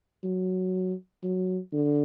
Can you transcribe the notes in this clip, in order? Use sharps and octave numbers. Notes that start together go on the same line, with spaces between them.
F#3
F#3
D3